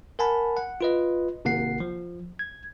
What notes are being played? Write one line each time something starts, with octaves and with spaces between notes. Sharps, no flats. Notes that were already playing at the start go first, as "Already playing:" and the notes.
A#4 F#5 G#5 A5 B5
F#5
F4 B4 D#5
G#1 C3 A#3 F#5 C7
F3
G#6